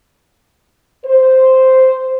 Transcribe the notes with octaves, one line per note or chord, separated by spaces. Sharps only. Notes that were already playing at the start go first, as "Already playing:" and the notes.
C5